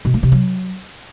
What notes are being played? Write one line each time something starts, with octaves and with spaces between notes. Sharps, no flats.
B2
A#3
C3
F#3